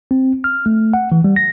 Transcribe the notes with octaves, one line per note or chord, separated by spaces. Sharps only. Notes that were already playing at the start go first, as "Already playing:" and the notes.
C4
F6
A3
F#5
E3
G3
A#6